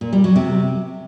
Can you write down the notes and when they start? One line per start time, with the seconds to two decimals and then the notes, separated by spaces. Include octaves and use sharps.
0.01 A#2
0.13 G3
0.24 F#3
0.36 C3